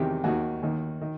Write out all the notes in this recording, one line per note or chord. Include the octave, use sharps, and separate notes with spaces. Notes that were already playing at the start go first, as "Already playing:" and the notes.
Already playing: E2 C3 D#3 G4
D#2 D#3 F#4
D#2 D#3
D#3